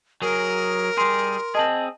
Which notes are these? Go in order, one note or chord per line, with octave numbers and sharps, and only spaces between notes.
F#3 G#4 A#4
G3 G#4 C6
C4 G#4 D#5 A5 F#7